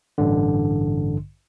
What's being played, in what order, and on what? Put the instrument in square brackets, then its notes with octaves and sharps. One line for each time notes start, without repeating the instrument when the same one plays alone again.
[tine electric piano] A1 G2 D3